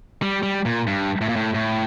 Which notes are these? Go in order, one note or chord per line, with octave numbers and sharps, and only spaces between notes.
G3
G3
A#2
G2
A2
A#2
A2
A2